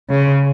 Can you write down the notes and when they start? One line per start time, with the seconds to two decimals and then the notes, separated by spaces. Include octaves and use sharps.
0.10 C#3